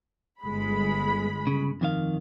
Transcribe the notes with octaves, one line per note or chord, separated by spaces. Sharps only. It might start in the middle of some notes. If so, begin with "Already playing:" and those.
G1 G#3 B5
C#3
F2 D#3 F5